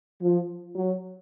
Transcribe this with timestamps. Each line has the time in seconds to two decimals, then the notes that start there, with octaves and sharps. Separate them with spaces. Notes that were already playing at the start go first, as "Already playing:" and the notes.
0.22 F3
0.75 F#3